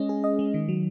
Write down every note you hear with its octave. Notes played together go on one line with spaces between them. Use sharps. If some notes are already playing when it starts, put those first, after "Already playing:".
Already playing: G#3 C#4 D#5
G#4
D#5
G#3
D#3
F#3